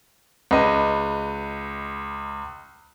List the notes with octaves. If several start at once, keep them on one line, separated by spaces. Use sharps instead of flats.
C#2 B4 D#5